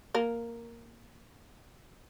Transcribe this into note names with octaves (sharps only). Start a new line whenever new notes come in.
A#3 A#4